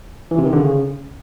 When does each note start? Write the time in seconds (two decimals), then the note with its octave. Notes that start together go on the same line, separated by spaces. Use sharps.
0.31 E3
0.38 C3
0.45 D#3
0.53 D3
0.60 C#3